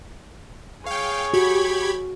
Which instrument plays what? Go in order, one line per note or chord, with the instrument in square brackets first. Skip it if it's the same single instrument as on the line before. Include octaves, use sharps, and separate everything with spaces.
[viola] G#4 C#5 [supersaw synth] F5 G5
[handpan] F#4 [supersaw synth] G4 B5 G#6